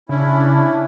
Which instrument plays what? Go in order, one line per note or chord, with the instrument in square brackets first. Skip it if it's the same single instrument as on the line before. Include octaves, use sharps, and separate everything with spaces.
[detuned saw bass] C#3 [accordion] C#4 E4 [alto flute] D4